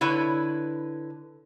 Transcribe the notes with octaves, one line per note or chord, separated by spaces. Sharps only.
D3 E4 B4 C#5